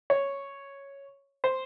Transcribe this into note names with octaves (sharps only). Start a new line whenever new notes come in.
C#5
C5